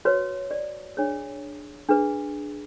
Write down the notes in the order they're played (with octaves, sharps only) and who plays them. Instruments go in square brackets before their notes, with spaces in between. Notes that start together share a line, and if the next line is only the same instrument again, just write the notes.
[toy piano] F#4 B4 C#5
D5
D4 G#4 C#5
D4 G#4 B4